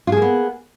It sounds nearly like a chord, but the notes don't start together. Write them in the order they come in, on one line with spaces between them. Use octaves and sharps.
F4 G#4 A#3 B3